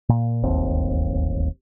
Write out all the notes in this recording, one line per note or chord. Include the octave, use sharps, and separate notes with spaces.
A#2
D1 G1 D#2 C4